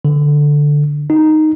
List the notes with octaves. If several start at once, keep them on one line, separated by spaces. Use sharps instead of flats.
D3
D#4